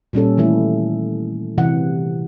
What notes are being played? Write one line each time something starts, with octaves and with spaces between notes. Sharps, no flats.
A#2 G3 C#4 A4
D#3 E3 A3 E4
C3 E3 F#5